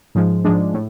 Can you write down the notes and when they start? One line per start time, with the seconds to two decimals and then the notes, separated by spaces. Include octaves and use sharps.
0.15 G#2 F3 G#3
0.44 G#2 F3 G#3 D4
0.74 A2